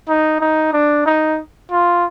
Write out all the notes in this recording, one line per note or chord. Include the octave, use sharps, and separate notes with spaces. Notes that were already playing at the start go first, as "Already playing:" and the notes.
D#4
D#4
D4
D#4
F4